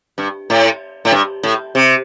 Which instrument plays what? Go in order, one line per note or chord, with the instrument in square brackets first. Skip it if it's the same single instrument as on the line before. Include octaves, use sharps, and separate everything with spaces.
[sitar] G2
A2
A2
G2
A2
C3